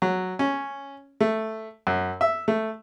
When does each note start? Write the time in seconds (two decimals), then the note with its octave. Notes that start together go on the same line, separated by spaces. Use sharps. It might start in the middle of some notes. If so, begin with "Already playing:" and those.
0.02 F#3
0.39 C#4
1.20 A3
1.87 F#2
2.21 E5
2.48 A3